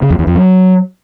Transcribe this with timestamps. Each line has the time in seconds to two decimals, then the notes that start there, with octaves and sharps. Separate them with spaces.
0.02 C#3
0.11 F2
0.19 E2
0.27 F2
0.35 F#3